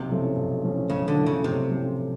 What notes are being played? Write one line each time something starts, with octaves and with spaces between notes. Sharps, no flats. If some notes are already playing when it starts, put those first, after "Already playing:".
Already playing: B1 C3
A2 F3 A3 C#4
B1
A2 F3 A3 C#4
B1 C#3
D3
A2 F3 A3 C#4
C#3
B1 C3
A2 F3 A3 C#4